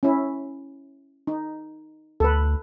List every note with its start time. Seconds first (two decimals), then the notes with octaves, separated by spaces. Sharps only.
0.03 C#4 E4
1.27 D#4
2.20 D2 A4 B4